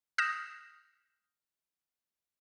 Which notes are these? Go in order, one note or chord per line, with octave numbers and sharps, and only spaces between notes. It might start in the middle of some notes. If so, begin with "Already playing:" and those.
D#6 F6 G6 A#6 E7